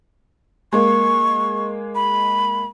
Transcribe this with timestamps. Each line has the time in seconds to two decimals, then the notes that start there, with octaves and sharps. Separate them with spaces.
0.73 G#3 A#3 C#6
1.95 B5